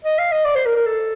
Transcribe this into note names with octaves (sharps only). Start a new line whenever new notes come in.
D#5
F5
D#5
D5
C5
A#4
A#4
A4